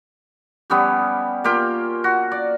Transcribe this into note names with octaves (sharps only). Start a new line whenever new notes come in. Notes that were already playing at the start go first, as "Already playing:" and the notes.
G3 B3 C#4 G4
A#3 F4 G4
F#4
D5